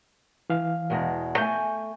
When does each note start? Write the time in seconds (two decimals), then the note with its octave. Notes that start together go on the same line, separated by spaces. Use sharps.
0.50 E3 F5
0.90 E2 B2 G#3
1.38 A3 G#5 G6